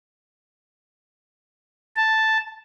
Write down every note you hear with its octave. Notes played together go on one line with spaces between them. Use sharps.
A5